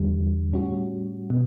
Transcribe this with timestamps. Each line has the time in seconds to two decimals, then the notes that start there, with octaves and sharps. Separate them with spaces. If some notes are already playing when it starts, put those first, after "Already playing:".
Already playing: E2 D3 G3
0.52 A2 G3 C#4 F#4
1.30 B2